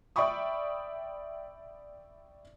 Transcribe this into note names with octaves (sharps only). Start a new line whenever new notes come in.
D5 E5 G5 B5 C#6 D#6